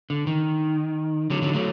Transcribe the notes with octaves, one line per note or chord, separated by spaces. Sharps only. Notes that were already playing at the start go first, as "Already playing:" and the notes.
D3
D#3
D3 F#3
D3 F#3
F#3 A3